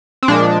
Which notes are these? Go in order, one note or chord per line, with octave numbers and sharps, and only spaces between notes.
C4
A#2 F3 G#3 D4